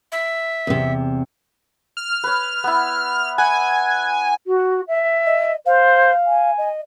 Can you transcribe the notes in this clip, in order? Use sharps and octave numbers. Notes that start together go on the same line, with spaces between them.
E5
E2 C3
F6
B4 C#5
B3 E4
F#5 G#5
F#4
E5
D#5
C5 F5
G#5
D#5